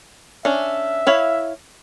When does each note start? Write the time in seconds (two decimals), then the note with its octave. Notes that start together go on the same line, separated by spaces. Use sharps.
0.45 C#4 D4 E5
1.07 E4 C#5 F5